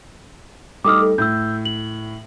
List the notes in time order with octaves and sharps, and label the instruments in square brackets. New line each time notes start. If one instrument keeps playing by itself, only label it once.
[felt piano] G3 A3 D#4 [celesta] D6 D#6 F6
[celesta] A4
[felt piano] A2 [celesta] E6 G6
[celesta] F#7